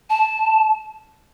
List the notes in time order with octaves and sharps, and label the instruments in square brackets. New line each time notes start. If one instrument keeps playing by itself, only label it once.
[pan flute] A5